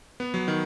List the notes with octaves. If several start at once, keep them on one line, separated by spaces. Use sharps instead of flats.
B3
F#3
D#3